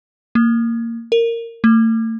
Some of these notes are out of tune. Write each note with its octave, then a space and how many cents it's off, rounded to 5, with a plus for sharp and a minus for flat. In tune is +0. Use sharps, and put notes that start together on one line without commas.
A#3 -15
A#4 -15
A3 +40